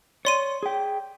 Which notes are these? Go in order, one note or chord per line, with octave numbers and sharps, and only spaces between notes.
C#5 D5 C6 D#7
G#4 G5